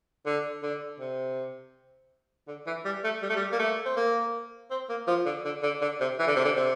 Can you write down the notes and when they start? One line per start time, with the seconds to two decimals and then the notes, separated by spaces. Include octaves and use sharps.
0.26 D3
0.63 D3
1.00 C3
2.48 D3
2.67 E3
2.85 G3
3.04 A3
3.22 G3
3.29 A3
3.36 G3
3.52 A#3
3.59 A3
3.85 C4
3.96 A#3
4.71 C4
4.89 A#3
5.08 F3
5.26 D3
5.45 D3
5.63 D3
5.82 D3
6.00 C3
6.19 E3
6.27 D3
6.36 C3
6.45 D3
6.56 C3